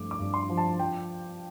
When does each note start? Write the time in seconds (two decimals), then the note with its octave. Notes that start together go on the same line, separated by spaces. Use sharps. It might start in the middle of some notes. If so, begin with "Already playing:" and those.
Already playing: G2 F3 A3 D6
0.11 D6
0.19 G2
0.34 C6
0.49 F3
0.57 A5
0.79 F3 G5